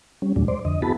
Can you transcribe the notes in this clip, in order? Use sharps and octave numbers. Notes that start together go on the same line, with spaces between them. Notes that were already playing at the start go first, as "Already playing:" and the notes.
G3 C#4
E2 A#2 F#3 G#3 D4
C5 D5
F2 D3 D#5
B3 E4 F#4 G#4 A5 B5